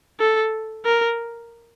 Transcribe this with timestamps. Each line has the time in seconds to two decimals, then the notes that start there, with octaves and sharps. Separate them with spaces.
0.20 A4
0.85 A#4